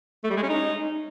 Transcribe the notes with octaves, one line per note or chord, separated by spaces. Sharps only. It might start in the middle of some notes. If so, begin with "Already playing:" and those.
A3
G3
G#3
C#4
D#4